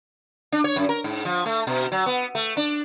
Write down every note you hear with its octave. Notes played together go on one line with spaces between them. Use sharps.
D4
C#5
F#2
A#4
G#2
F3
A3
B2
F#3
B3
A3
D4